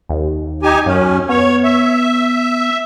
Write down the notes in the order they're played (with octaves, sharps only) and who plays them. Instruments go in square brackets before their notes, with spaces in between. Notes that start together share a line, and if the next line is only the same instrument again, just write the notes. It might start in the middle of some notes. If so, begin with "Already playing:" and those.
[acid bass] D#2
[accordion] D#4 G4 G#5
[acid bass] F#2 [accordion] C#4
[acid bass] B3 [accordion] C#5
[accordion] E5